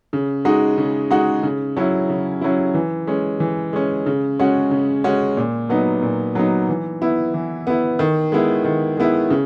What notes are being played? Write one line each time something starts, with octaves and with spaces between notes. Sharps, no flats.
C#3
G#3 D#4 F#4
C#3
G#3 D#4 F#4
C#3
F#3 C#4 E4
C#3
F#3 C#4 E4
E3
G#3 C#4
E3
G#3 C#4
C#3
G#3 C#4 F#4
C#3
G#3 C#4 F#4
A#2
F#3 B3 D#4
A#2
F#3 B3 D#4
E3
B3 E4
E3
B3 E4
D#3
G#3 B3 E4
D#3
G#3 B3 E4
C#3